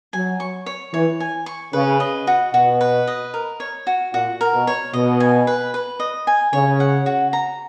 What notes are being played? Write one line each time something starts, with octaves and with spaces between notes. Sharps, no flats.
F#3 G#5
C#6
C#5
E3 C#5
G#5
C#6
C#3 B4
D#5
F#4
B2 F#4
B4
D#5
A#4
C#5
F#4
A#2 F#4
A#4
B2
C#5
B2 D#5
G#5
B4
B4
D#5
G#5
C#3 C#5
F#5
F#4
A#5